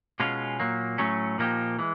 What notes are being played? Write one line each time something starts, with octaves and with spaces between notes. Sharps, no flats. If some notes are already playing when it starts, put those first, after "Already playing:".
B2 G#3 C#4 F4
A#2 F#3 A#3
A2 F#3 A3 C#4
A#2 F3 A#3 D#4 G4
E3 G#3